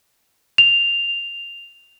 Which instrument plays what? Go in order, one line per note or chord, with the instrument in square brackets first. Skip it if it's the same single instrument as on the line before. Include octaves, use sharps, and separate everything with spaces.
[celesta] F7